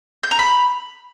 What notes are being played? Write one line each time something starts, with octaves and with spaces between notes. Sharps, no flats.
G6
A#5
B5